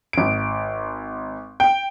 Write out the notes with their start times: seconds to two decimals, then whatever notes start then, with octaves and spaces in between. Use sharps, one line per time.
0.13 G#1 D7
1.60 G5